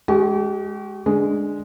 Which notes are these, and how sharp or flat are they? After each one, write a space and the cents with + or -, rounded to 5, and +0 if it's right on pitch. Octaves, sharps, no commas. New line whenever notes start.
G#3 +5 G4 -40 C#6 -10
D3 +0 G#3 +0